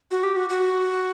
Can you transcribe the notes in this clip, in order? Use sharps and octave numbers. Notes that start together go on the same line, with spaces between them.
F#4
G4
F#4
F#4